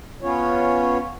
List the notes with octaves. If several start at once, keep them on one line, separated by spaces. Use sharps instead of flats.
B3 C#4 F4 C#5